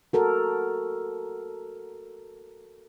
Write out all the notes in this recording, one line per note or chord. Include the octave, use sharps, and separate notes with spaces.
F#4 A4 A#4